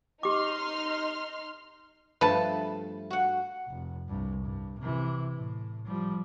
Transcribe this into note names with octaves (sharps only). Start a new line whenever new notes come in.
D#4 G4 C6 D6 F6
G2 F3 A3 B4 A5
F#4 F#5
F1
C2 G2
G2
C3 E3
A2
F3 G3